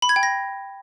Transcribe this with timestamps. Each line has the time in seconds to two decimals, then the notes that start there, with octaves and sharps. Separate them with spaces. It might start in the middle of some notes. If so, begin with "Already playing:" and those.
0.02 B5
0.09 G#6
0.16 G5
0.23 A#6